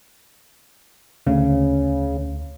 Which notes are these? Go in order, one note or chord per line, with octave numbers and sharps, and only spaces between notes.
D2 C#3